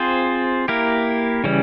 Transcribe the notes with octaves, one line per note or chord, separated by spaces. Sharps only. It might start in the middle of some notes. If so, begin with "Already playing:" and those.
Already playing: C4 F4 G#4 C5
A#3 E4 G4 A#4
C#3 E3 G3 C#4